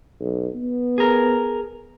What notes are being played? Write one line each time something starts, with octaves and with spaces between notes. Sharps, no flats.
B1
B3
G#4 A#4